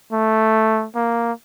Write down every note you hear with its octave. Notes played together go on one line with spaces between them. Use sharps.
A3
A#3